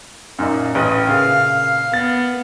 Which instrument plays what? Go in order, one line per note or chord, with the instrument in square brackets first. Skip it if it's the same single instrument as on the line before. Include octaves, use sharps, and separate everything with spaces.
[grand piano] F#2 A#2 D#4
A1 B4 D#6
[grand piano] A#2 C#3 [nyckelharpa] F5
[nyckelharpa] B3 [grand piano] A6